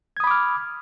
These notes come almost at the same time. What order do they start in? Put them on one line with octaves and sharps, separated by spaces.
G#6 D#6 B5 D6 F6